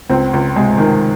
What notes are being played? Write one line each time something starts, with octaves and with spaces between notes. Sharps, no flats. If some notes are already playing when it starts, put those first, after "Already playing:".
C#2 C4
C#2
C3 G#3
D#3